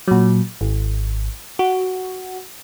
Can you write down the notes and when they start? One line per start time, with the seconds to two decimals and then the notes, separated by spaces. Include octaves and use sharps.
0.08 A#2 F#3
0.61 G#1
1.59 F#4